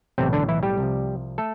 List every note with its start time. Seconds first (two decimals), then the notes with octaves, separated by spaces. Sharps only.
0.18 B1 A2 C3 E3 C4
0.33 D3 D4
0.49 E3 E4
0.63 G3 G4
0.78 C2 C3 F3
1.38 A3 A4